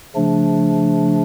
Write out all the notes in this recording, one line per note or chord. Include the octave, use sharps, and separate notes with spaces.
C#3 F3 A3 D4